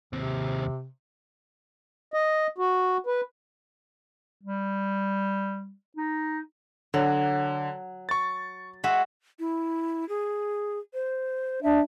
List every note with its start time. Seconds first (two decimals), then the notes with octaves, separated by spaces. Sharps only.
0.13 D#2 C3 C4
2.14 D#5
2.58 F#4
3.06 B4
4.44 G3
5.97 D#4
6.94 D3 F#3
8.09 C#6 A6
8.84 G#3 F#4 E5
9.39 E4
10.09 G#4
10.94 C5
11.63 D4 E5